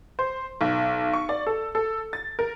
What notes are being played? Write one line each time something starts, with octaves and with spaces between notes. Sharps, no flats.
C5
B1
C#6
D5
A4
A4
A6
A#4